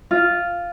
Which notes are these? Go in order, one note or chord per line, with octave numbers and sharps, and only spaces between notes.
F4